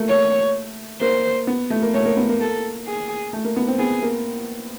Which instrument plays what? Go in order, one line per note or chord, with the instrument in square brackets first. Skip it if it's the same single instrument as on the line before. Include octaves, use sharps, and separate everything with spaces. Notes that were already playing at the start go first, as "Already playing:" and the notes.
Already playing: [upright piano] A3 A#3
[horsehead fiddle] C#5
[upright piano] A#3 [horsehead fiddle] C5
[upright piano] B3
A3
A#3
[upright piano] A3 [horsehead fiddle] C#5
[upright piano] A#3
B3
A#3
[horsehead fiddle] A4
G#4
[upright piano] A3
A#3
B3
C4
[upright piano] B3 [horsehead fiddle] G#4
[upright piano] A#3